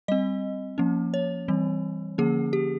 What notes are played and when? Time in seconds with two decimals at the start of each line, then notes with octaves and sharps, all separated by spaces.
0.08 G3 C4 D#5
0.78 F3 A#3 C#4
1.14 C#5
1.48 E3 G3 C4
2.18 D3 F3 A#3 C#4 G#4
2.53 G4